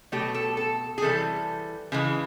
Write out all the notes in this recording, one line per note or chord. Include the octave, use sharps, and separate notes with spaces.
B2 F#3 A3 G4
A4
A4
G#4
C3 E3 G3 A4
C#3 E3 G#3